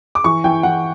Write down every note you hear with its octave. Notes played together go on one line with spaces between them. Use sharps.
D6
E3 C#6
E3 G5
E3 F#5